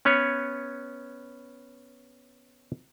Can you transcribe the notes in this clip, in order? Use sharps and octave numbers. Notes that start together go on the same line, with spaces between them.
B3 C#4 B4 C#5